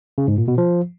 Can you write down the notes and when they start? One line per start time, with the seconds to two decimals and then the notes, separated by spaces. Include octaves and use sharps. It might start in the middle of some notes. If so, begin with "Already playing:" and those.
0.18 C#3
0.28 G#2
0.38 A#2
0.48 B2
0.58 F3